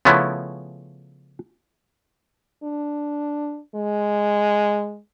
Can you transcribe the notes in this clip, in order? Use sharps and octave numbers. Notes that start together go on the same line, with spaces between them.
C#3 F3 A3 B3 C#4 E4
D4
G#3